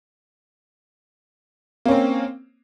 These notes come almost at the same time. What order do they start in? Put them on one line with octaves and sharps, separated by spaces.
A#3 C#4 C4